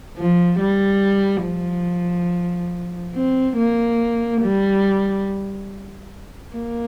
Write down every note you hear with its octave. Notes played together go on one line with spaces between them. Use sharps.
F3
G3
F3
C4
A#3
G3
A#3